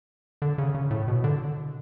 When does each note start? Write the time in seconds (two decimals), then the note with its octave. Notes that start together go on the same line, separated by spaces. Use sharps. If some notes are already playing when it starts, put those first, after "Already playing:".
0.42 D3
0.58 C#3
0.74 C#3
0.91 A2
1.08 B2
1.24 D3